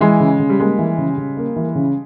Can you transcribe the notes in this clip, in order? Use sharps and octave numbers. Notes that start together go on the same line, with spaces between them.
E3 G#3
C#3
C#3
G3
G#3 A#3
E3
C#3
C#3
A#3
E3
C#3